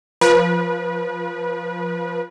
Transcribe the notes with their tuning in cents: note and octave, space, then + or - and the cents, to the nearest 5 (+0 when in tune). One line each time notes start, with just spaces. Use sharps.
F3 +0 B4 -30